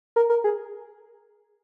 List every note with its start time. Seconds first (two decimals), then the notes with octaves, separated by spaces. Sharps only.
0.16 A#4
0.30 A#4
0.44 G#4